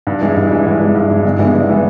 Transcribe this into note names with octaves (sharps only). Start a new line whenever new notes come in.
G2
E3 G#3
G2
E3 G#3
G2
E3 G#3
G2
E3 G#3
G1
G2 E3 G#3 B3
G1
E3 G#3 B3